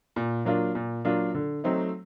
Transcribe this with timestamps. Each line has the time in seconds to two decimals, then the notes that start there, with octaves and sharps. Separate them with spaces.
0.16 A#2
0.45 F#3 A#3 D4 F4
0.75 A#2
1.05 F#3 A#3 D4 F4
1.34 D3
1.64 F#3 A3 C4 D#4